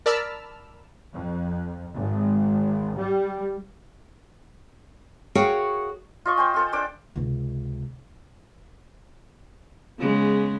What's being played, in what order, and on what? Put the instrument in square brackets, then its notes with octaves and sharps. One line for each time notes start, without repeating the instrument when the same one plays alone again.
[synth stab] A#4 D5 A5 B5 E6 F6
[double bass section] F2
G#1
G3
[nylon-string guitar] F#4 G#4 A#4 C#5 F5 G5
[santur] F4 D#5 C#6
C5 G5 G#5
F4 A4 C5
D4 C5 G5 D6
[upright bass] C#2 C3
[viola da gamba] C#3 G#3 B3